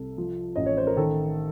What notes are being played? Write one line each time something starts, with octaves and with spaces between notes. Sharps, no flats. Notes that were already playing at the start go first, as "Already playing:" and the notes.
Already playing: C2 A4
F3
A1 D#5
C#5
C5
A#4
D#3 A4